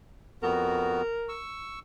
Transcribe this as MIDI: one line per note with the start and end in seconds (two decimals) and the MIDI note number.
0.43 1.02 41
0.43 1.02 59
0.43 1.02 66
0.43 1.39 70
1.29 1.79 85
1.29 1.79 88